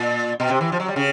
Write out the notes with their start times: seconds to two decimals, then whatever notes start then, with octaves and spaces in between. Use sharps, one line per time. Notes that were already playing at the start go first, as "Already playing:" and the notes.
Already playing: A#2
0.40 B2
0.50 C3
0.61 E3
0.72 F3
0.80 F#3
0.88 G3
0.96 C#3